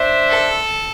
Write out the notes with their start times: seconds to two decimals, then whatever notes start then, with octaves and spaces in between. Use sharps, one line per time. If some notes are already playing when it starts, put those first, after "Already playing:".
Already playing: D4 C5 E5
0.29 A4